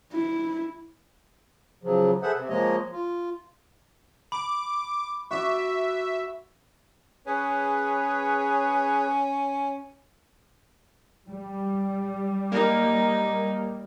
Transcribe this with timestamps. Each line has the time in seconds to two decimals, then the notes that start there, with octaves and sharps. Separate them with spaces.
0.13 E4
1.83 C#3 F3 F#3
2.23 G#4 A4 B4 C5 E5 F#5
2.36 C3
2.49 F3 G#3 A#3 C#5 D#5
2.92 F4
4.32 B5 D6
5.31 F#4 D5 E5
7.26 C#4 G#4 B4 C#5
11.27 G3
12.52 A#3 D#4 A#4